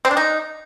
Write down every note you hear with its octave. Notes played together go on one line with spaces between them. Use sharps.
C4
D4
D#4